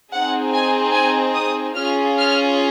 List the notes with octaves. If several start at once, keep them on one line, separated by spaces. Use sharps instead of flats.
C4 D#4 G#4 F#5
G#5
G#5
D#6
C#4 F4 G#4 F6
F6